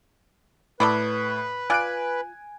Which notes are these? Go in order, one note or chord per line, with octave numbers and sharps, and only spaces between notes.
A2 A4 B4 D5 B5
F4 D5 G#5 F#6 D7